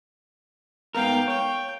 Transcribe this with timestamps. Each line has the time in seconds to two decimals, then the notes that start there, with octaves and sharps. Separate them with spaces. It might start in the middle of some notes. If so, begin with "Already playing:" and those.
0.95 G#2 B3 A#4 F5 G5
1.28 C#5 G5